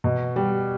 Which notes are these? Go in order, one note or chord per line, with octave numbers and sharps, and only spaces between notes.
B2
G3